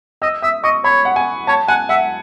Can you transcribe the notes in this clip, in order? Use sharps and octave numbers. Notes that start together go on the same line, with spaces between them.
D#5 E6
E5 D#6
D#5 C#6
C#5 B5
F#5
G#5
C#5 A5
F#5 G#5
E5 F#5